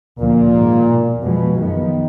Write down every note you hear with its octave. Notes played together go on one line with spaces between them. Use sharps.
D2 A#2 D3 F3 A#3
G#2 D#3 G#3
B2 A#3
F2 B2 F3 G#3 B3
F#2 D#3 F3 B3